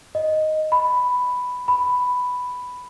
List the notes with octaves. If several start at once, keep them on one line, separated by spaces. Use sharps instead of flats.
D#5
B5
B5